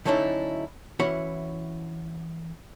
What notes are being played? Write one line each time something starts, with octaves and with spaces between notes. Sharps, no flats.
D3 F#3 A3 C#4 D#4 E4
E3 C#4 E4 F#4 F#5 B5